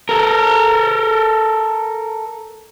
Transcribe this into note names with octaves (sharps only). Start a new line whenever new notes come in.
A4 A#4